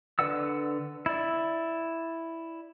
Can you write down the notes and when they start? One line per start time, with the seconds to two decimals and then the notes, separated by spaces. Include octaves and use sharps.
0.19 D3 B4 D5 F#5 E6
1.06 E4 D5